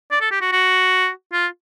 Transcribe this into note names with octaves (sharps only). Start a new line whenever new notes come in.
D5
A4
G4
F#4
F#4
F4